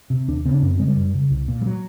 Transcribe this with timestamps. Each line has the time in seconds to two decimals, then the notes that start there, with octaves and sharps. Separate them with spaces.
0.10 C3
0.28 D#2 D4
0.45 C#3 C4
0.54 D4
0.62 F#2 C#4
0.71 C4
0.79 C#3 G#3
0.88 G3
0.96 F#2
1.14 C#3
1.30 C2
1.48 A#2
1.61 G3
1.66 F#3